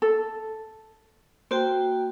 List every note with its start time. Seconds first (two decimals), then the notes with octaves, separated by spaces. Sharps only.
0.02 A4
1.51 A#3 F#4 C5 G5